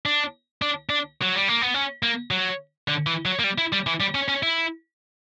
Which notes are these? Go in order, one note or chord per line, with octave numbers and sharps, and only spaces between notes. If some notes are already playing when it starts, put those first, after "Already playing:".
D4
D4
D4
F#3
G3
A#3
B3
C#4
A#3
F#3
D3
E3
F#3
A#3
G3
E4
G3
E3
G3
C#4
C#4
E4